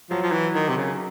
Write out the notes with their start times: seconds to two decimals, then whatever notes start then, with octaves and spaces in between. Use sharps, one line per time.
0.10 F3 F#3
0.23 F3
0.32 E3
0.54 D#3
0.69 C3
0.77 C#3